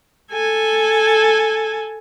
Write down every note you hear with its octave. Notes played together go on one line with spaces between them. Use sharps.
A4 G#5